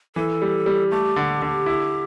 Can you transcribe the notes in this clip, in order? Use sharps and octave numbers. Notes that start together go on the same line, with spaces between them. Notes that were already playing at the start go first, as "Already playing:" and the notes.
E3 A4
G3
G3
A3 G4
D3
D3
E4